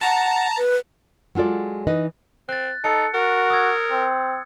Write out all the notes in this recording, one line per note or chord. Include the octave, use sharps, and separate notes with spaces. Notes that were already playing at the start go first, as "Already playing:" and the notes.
F#5 A5 A#5
B4
F#3 G#3 F4 A4 D5
E3 D#4 B4 D#5
C4 F#6 A6
D#4 A4 C#7
F#4 A#4
D#6 E6 G#6
C4